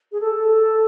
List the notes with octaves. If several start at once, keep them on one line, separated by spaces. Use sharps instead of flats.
G#4
A4